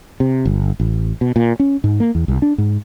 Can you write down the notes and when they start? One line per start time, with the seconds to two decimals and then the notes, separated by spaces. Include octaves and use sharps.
0.20 C3
0.46 G1
0.80 A1
1.21 B2
1.36 A#2
1.60 C#4
1.84 G#2
2.00 A#3
2.15 E2
2.28 C2
2.42 D4
2.58 G#2